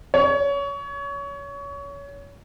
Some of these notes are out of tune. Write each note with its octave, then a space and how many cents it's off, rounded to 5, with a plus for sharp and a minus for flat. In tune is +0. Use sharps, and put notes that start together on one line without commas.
C#5 +25